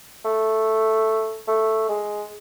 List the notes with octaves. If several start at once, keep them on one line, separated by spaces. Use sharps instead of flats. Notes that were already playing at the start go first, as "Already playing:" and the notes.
A3
A3
G#3